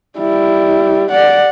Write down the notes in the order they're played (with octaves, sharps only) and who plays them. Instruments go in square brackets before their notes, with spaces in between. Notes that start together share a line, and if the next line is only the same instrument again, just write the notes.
[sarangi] G3 [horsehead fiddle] E4
[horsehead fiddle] D5 [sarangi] F#5